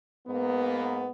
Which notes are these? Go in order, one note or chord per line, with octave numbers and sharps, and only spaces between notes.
G#2 A#3 B3